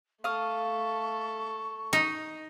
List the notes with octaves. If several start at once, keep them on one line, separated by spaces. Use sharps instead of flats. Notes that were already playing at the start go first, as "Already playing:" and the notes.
A3 A4 F5 C#6 D#6
D#4